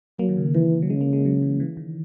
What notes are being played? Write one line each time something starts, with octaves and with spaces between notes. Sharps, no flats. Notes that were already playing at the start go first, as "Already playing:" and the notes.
F#3 A#3
D#3
C#3
D#3 E3
F#3
C#3 G#3
A#3
G#3
F#3
E3
E3
D#3